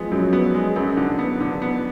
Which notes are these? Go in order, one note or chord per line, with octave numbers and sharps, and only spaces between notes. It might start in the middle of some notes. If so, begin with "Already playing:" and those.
Already playing: F3 G#3 B3
F#2 F#3
B3
G#3
F#2
D3
B3
D3
B3